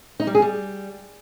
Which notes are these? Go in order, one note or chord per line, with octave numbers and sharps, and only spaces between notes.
D#4
G3
G#4
G3